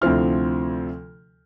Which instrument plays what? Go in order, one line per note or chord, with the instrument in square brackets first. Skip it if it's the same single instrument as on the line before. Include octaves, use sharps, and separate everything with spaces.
[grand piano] D2 C3 F3 C4 E4 F6